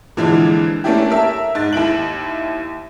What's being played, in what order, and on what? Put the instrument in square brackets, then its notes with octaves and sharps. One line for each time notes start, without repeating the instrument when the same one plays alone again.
[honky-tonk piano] A#2 D3 E3 F3 G#3
A3 A#3 C#4 D4 E4 G4
A#4 E5 A5
G#2 A6
D#2 E4 D7 F#7